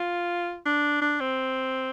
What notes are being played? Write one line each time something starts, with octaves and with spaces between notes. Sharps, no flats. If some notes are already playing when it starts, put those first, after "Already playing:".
Already playing: F4
D4
D4
C4